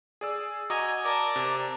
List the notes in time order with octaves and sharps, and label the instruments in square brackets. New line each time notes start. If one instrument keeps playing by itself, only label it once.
[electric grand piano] G#4 D5 E6
[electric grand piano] F#4 D6 D#6 [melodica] D#5 A#5 [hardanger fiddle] G#5
[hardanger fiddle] A#4 A5 [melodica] D5
[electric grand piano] C3